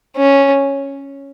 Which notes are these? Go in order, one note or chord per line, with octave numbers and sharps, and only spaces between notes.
C#4